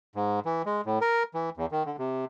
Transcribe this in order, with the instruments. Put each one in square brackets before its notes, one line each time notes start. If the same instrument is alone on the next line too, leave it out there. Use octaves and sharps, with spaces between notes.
[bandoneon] G#2
E3
G#3
A2
A#4
E3
E2
D#3
D3
C3